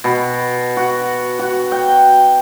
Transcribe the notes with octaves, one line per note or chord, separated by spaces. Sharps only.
B2
F#4
F#4
G5